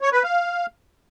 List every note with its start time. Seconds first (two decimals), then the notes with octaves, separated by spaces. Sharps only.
0.01 C#5
0.13 B4
0.24 F5